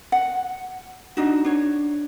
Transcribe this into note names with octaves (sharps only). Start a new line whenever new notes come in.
F#5
D4 D#4 F#4
D4 C#5